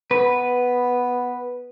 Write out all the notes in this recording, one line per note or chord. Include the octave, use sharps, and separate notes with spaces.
B3 B4